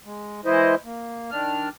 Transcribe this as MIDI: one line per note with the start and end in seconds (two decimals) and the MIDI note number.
0.05 0.41 56
0.45 0.75 52
0.45 0.75 56
0.45 0.75 64
0.45 0.75 72
0.45 0.75 75
0.85 1.31 58
1.31 1.69 51
1.31 1.69 62
1.31 1.69 89